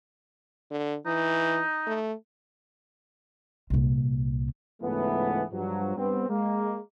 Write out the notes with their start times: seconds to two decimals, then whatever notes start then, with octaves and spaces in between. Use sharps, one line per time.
0.71 D3
1.06 E3 D#4
1.87 A3
3.70 C2 A#2
4.83 C#2 G#2 E3 A3 B3
5.52 G2 F3 F#3
5.96 G2 B3 C4
6.29 G#3 A#3